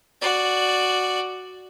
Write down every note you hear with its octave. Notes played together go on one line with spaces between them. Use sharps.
F#4 D5